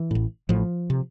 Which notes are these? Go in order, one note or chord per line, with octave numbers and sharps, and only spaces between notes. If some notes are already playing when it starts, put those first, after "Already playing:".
Already playing: E3
A1 A2
A1 A2 F3
C3